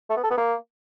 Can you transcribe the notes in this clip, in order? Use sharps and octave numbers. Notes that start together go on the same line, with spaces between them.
A3
B3
A4
B3
A#3